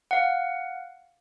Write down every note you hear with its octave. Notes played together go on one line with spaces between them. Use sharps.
F5 F#5